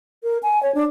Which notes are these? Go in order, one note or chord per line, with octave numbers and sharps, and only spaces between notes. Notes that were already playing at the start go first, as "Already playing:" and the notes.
A#4
G#5
C#5
D4